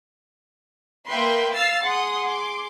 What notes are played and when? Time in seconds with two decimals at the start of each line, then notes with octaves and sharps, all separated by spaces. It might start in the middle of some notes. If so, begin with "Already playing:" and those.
1.07 A#3 B4 E5 G5 C6
1.54 F5 E6 A6 C7
1.83 G#4 F#5 C6 D#6
2.27 D6